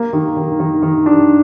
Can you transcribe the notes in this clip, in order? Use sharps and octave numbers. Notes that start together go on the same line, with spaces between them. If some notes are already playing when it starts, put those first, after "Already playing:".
Already playing: A#3
D#3
D#3
D#3
D#3
D4